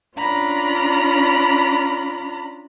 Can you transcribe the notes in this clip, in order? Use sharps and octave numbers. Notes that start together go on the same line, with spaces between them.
C#4 D4 F4 A#5 B5